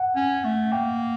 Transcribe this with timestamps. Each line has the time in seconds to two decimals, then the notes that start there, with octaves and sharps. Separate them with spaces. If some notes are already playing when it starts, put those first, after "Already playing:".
Already playing: F#5
0.16 C#4
0.44 A3
0.72 A#3 G5